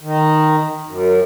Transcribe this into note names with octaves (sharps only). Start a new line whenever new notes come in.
D#3
F#2